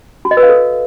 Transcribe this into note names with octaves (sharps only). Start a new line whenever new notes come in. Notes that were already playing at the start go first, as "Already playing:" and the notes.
F#4
D#5
B4
F5
A4